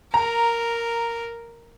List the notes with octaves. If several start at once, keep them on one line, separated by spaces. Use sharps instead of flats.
A#4 A#5